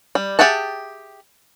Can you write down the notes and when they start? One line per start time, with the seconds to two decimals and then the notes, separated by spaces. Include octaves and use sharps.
0.15 G3
0.39 G4 G#4 E5 F#5 A5